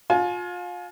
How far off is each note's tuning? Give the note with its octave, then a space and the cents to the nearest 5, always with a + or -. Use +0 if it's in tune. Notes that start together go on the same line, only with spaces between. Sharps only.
F4 +30 G#5 +40